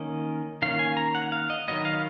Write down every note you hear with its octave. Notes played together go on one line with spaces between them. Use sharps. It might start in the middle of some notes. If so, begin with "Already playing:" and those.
Already playing: D#3 A#3 C#4 D#5
D#3 A#3 C#4 F5
G#5
A#5
F#5
F5
D#5
D#3 F#3 B3 D#5
F5